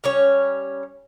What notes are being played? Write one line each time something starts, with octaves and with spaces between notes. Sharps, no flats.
G3 C#4 C#5